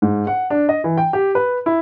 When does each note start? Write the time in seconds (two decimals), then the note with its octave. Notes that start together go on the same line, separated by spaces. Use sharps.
0.02 G#2
0.27 F#5
0.50 D4
0.69 D#5
0.84 E3
0.98 G5
1.13 G4
1.35 B4
1.66 E4